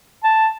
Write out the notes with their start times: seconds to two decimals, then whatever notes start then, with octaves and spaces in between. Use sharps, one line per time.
0.24 A5